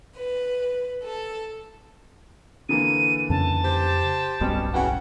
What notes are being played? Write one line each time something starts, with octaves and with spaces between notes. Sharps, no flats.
B4
A4
D3 E3 A#3 D#7
F2 C#3 C#4 A5
G4 C5
D1 B1 G2 B2 G3 C#4
C#3 E3 C#4 F#4 F#5 G5